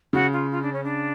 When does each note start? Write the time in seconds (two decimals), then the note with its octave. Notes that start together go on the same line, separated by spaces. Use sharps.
0.13 C#3 F#4
0.32 F4
0.50 F4
0.62 D4
0.72 C#4
0.83 D4